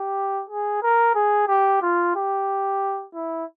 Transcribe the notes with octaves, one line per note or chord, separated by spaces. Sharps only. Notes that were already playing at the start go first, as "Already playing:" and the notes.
Already playing: G4
G#4
A#4
G#4
G4
F4
G4
E4